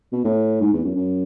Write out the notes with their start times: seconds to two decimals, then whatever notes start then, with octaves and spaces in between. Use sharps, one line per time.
0.12 B2
0.25 A2
0.61 G#2
0.73 E2
0.85 F#2
0.96 F#2